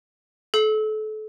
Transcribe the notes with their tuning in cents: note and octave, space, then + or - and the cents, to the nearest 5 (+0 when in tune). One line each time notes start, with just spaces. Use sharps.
A4 -30